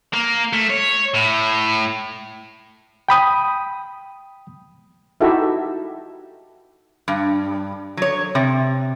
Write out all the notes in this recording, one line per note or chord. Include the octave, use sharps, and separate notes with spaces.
A#3
A3
C#5
A2
G5 B5 D#6
D#4 E4 F#4 G4 A4 E5
G2
F#3 C#5
C3